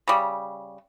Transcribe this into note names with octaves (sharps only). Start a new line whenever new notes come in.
C#3 G3